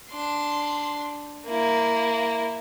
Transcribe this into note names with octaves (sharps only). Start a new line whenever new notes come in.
D4 C6
A#3 E4